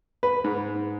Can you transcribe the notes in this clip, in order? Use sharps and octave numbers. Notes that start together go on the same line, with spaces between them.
B4
G#2